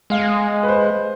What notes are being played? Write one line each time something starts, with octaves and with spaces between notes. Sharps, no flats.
G#3 F5
B4
C5